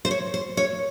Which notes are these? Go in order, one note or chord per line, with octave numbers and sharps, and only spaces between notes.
C5
C#5
C5
C#5